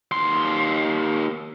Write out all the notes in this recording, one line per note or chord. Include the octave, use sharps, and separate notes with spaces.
D#2 C6